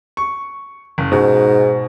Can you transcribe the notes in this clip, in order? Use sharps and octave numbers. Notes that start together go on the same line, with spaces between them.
C#6
F#1
G#2 B2